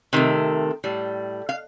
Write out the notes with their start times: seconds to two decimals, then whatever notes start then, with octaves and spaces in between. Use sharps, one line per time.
0.13 C3 D#3 A3
0.84 A2 G3
1.49 F5